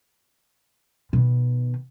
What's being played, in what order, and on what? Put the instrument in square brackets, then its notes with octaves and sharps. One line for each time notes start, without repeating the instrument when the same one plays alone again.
[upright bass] B2 D#3